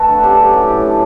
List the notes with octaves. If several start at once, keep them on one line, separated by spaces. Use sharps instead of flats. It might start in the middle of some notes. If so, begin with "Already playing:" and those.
Already playing: A3 F#4 A4 B4
D3
C#4 G4
F#3
A2
A2
D4